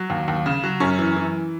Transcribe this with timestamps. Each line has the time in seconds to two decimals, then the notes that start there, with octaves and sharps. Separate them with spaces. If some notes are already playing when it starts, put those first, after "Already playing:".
Already playing: F#3
0.10 D#2
0.28 D#2
0.46 C#3
0.63 F#3
0.80 F#2 C#4
0.99 E3
1.16 E3